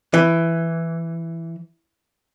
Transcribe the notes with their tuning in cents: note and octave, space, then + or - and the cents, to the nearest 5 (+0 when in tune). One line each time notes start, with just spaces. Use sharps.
E3 +10